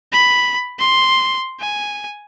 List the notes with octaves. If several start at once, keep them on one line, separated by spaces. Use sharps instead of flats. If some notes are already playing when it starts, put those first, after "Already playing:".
B5
C6
G#5